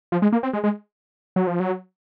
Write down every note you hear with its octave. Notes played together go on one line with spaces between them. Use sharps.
F3
G#3
A#3
C4
G#3
G#3
F#3
F3
F#3